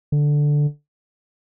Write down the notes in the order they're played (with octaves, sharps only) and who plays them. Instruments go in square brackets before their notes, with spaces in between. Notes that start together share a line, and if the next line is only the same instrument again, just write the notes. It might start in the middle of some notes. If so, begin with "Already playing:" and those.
[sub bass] D3